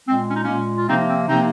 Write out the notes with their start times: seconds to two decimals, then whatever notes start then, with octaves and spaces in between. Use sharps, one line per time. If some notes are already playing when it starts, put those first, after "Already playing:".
0.08 A#2 G#3 C4
0.29 C#4
0.35 D#4
0.43 A#3 C#4
0.48 A#2 G#3
0.76 F4
0.88 C3 F3 A#3 C4 D#4
1.08 C4
1.28 C3 F3 A#3 C4 D#4